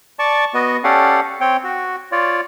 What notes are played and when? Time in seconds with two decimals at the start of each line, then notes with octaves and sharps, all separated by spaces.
0.19 D5 A5 C#6
0.54 B3 F#4 D#5
0.84 C#4 G4 A4 D5 F5 F#5
1.41 C4 C#5 G5
1.64 F#4
2.12 F4 C#5 D5